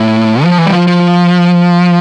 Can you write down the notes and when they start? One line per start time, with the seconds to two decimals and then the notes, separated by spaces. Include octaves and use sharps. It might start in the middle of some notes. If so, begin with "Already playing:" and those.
Already playing: A2
0.44 F3
0.58 E3
0.66 G3
0.73 F3
0.87 F3